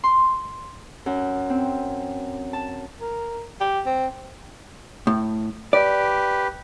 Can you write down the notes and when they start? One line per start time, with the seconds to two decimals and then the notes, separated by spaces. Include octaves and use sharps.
0.04 C6
1.06 F#2
1.50 C4
2.53 A5
3.01 A#4
3.61 G4
3.86 C4
5.07 A2
5.73 G4 B4 D5